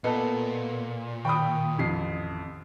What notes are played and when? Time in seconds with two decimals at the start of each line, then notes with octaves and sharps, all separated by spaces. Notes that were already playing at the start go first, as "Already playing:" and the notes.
0.04 A#2 B3 A4 D#5
1.25 D#3 G5 B5 D#6
1.78 A1 F2 C7